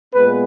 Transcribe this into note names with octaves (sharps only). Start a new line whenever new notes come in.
A#2 G#3 B3 B4